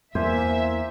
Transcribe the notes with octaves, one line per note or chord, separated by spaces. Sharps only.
E2 A#3 C5 D5 E5 G#5